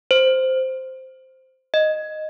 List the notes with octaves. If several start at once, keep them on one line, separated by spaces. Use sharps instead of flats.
C5
D#5